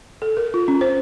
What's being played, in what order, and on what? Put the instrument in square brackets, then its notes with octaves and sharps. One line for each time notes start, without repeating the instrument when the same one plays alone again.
[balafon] A4
A#4
F4
C#4
C5